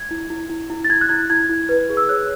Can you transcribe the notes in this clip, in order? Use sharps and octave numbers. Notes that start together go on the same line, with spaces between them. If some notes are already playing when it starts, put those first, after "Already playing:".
Already playing: G#6
E4
E4
E4
E4
A6
E4 G#6
F#6
E4 G#6
E4 G#6
E4
B4
G#4
E6
C#5 F#6